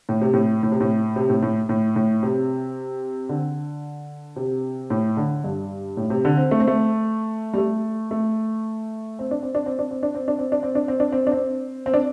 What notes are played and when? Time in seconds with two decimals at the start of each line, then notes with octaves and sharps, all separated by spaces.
0.09 A2
0.21 C3
0.34 A2
0.63 A2
0.72 C3
0.81 A2
1.16 C3
1.30 A2
1.43 A2
1.69 A2
1.96 A2
2.23 C3
3.29 D3
4.36 C3
4.90 A2
5.17 D3
5.44 G2
5.97 A2
6.10 C3
6.25 D3
6.37 C4
6.51 A3
6.60 C4
6.67 A3
7.53 G3
7.58 A3
8.11 A3
9.19 C4
9.31 D4
9.43 C4
9.55 D4
9.66 C4
9.79 D4
9.91 C4
10.03 D4
10.15 C4
10.28 D4
10.39 C4
10.52 D4
10.63 C4
10.75 D4
10.88 C4
11.00 D4
11.12 C4
11.27 D4
11.32 C4
11.86 C4
11.94 D4